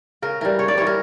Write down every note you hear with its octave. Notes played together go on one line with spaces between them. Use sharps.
C#3 A#4
E3 G3 A#4
C#3 C#5
D5
E3 G3 C#5
A#4